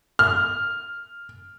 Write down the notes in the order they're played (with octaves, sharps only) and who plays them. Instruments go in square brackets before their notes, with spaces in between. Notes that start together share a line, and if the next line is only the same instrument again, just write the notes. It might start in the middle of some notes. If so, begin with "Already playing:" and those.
[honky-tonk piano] F6